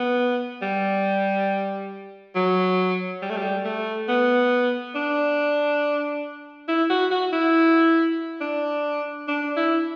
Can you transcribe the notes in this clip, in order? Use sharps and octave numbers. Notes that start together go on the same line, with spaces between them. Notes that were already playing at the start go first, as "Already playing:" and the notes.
Already playing: B3
G3
F#3
G3
A3
G3
A3
B3
D4
E4
F#4
F#4
E4
D4
D4
E4